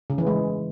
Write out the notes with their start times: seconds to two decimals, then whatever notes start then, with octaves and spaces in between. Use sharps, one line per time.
0.10 C#3
0.18 E3
0.27 G#3